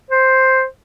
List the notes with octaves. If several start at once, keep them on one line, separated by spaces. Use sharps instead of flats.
C5